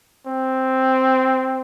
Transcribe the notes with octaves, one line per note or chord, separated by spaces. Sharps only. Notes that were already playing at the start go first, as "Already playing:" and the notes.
C4